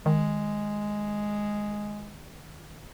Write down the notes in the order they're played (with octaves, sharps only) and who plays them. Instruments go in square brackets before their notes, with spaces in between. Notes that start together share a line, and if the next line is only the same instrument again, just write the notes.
[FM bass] D#3 [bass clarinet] G#3